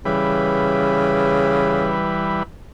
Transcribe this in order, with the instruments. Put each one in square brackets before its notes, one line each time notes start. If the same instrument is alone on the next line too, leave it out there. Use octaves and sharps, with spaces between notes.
[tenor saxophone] C#3 [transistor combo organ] E3 G3 B4